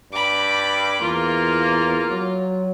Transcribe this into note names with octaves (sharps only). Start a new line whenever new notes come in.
G2 B5 D6
E2 A#3 F4
F#3